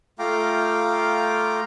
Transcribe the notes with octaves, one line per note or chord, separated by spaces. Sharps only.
A3 F4 F5 G5 A#5 D6